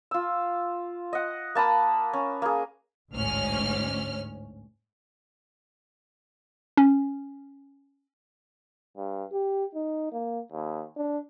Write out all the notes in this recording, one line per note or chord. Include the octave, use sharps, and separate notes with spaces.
F4 E6
D#5 F#5
A#3 A5 B5 D#6
C#4
A#3 G#4
A1 D2 G#2 C#4 F6
C#4
G2
G4
D#4
A#3
D#2
D4